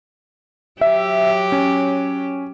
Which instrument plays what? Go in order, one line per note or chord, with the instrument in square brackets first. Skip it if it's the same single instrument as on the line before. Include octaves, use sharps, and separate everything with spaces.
[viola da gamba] F#3 G4 [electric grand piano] E5
[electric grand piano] C#4